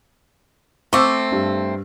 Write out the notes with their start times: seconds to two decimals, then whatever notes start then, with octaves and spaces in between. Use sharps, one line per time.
0.93 A3 C4 C#6 D6 E6
1.32 G2